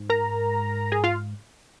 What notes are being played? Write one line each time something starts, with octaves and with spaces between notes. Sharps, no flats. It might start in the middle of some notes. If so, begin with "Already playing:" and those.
Already playing: G#2
A#4 A#5
G#4 G#5
F4 F5